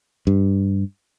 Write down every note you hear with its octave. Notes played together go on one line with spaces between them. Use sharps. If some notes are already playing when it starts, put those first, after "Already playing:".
G2